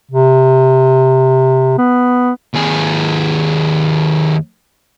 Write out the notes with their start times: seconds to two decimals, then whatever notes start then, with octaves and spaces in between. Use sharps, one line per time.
0.11 C3
1.78 B3
2.54 D#2 G#4